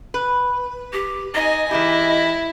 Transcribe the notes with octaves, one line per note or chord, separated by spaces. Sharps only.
B4
G4
D#4 D#5 G#5
E3 G#3 E4 G4